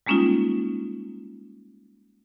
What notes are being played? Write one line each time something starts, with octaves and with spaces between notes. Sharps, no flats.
G3 G#3 A#3 C#4 D#4 F4